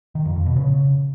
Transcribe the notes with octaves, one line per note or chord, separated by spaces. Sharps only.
D#3
F2
F2
B2
C#3